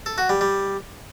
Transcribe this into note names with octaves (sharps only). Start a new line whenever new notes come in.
A4
F#4
G3
G3